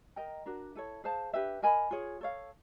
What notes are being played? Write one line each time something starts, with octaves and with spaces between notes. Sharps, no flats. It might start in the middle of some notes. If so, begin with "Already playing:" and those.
A#4 D#5 G5 A#5
D4 F#4 A#4
E4 A4 C#5
G#4 C5 F5 A5
D4 G4 B4 E5
A#4 D#5 G#5 B5
F4 G#4 C#5
A4 C#5 F5